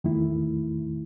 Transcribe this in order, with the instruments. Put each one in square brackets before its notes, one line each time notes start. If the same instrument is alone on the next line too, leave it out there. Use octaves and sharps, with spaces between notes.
[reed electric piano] E2 D#3 A3 E4